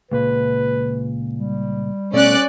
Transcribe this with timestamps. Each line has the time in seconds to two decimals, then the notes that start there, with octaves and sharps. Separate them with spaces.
0.12 C#2 A#2 B4
1.35 G3
2.13 B2 A3 C#4 D5 F#6